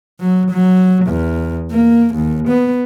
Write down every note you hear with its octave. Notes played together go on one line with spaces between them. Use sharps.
F#3
F#3
E2
A#3
D#2
B3